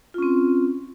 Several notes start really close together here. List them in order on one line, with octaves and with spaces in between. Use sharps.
F4 C#4 C4